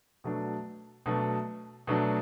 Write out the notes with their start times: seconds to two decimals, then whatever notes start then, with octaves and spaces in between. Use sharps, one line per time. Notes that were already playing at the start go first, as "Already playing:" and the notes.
0.24 B2 F#3 A3 D4
1.06 B2 F#3 A3 D4
1.87 B2 F#3 A3 D4